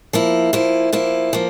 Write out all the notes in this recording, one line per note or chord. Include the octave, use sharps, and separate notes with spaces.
F3 A#3 E4
F3 A#3 E4
F3 A#3 E4
F3 A#3